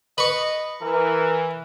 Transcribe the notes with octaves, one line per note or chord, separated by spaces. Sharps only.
B4 D#5 C#6
E3 A#4